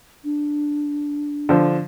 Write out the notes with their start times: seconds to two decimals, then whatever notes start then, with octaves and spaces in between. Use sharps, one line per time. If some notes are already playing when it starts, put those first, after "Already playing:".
0.24 D4
1.49 D3 F3